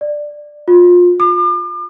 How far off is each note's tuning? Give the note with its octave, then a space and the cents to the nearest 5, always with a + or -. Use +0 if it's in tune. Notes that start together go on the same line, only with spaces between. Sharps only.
D5 +10
F4 +25
D6 +40